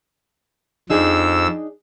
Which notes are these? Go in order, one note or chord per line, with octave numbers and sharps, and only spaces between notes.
F2 D4 D#4 G#4 E6